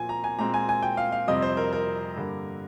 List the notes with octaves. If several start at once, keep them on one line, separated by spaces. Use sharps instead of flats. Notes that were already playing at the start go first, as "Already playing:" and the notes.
Already playing: A#2 F3 C4 G#5
A#5
G#5
A#2 G#3 C4 A#5
G#5
G#5
G5
F5
F5
F2 C3 G3 C4 D#5
C5
A#4
A#4
G2 D3 G3 A#3